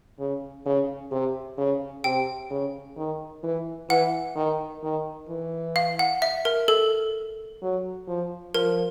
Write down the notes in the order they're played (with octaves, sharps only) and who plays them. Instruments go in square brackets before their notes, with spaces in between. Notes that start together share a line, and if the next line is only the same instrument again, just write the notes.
[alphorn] C#3
C#3
C3
C#3
[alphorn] C3 [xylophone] G5
[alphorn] C#3
D#3
E3
[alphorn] E3 [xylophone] F#5
[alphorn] D#3
D#3
E3
[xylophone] F5
F#5
E5
A#4
A4
[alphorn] F#3
F3
[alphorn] F3 [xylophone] A#4